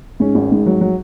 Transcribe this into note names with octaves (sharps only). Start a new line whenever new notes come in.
G#2 C#4
G#1
G#2
F#3
F#3